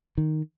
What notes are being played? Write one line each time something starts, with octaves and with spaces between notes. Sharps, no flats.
D#3